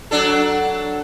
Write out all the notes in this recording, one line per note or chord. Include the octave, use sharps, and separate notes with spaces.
F#3 D4 A4